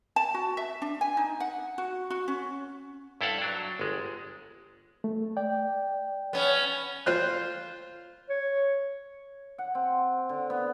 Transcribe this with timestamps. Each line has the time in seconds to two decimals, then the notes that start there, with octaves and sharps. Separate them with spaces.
0.16 A5
0.34 F#4
0.57 E5
0.82 D4
1.01 G#5
1.17 D#4
1.40 F#5
1.78 F#4
2.10 F#4
2.28 C#4
3.21 G2 E4 A4 C5 F5 F#5
3.42 F#3 D4
3.79 G1 G#3
5.04 A3
5.37 D5 G5
6.33 B3 C#4
7.06 F4 C5 F#6
8.29 C#5
9.58 F#5
9.75 C4
10.29 D3
10.50 B3